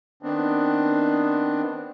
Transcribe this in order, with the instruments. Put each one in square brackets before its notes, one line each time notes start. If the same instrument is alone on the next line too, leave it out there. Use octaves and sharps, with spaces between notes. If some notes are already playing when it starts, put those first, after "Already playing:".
[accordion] D#3 B3 C4 D4